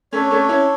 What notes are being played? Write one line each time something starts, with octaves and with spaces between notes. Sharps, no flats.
A3 C#4 D4 A4 C#5
A3 C#4
C#4 E4